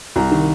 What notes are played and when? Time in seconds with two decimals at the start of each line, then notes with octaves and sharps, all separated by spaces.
0.16 C2 A#5
0.31 D#3